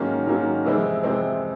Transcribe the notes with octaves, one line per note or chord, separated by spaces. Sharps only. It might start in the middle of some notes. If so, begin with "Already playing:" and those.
Already playing: G#2 D#3 F#3 A#3 C#4
G#2 D#3 F#3 A#3 C#4
F2 C3 E3 G#3 C4
F2 C3 E3 G#3 C4